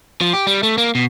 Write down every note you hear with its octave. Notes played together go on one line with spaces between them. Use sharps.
F3
G4
G3
A3
A#3
B2